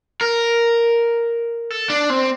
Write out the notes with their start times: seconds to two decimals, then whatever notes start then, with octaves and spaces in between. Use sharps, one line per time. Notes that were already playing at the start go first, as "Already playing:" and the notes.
0.21 A#4
1.70 A4
1.90 D4
2.10 C4